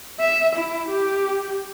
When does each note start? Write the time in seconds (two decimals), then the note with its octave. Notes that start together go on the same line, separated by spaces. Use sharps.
0.20 E5
0.56 E4
0.89 G4